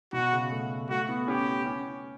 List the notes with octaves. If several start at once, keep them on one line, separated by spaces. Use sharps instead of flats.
B2 F#4
C#3
A3
A3 F#4
B3
C#4 G4
C#4